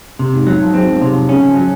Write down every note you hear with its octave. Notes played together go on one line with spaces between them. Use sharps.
C3
G#2
G#2 F#3
F3
G#3 C4
F#3
C3
F3
C#3 C#4
F3
F#3